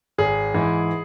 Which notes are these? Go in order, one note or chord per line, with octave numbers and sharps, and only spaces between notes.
G#1 G#4
G#2 E3